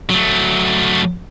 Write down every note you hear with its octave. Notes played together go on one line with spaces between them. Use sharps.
F#3 A3